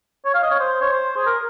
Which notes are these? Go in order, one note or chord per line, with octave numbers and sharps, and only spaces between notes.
C#5
F5
D#5
C#5
C5
C#5
C5
G#4
A#4